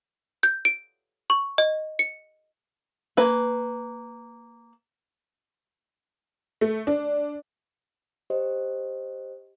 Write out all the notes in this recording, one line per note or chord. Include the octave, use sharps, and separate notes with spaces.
G6
D7
C#6
D#5
C#7
A#3 B4 G#5
A3
D4
G4 C5 D#5